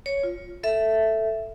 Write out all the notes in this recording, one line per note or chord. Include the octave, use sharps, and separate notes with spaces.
C#5
F4
A4 E5